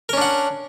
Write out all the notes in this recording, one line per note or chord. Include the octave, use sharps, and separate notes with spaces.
C#4 D4 A#4 F#5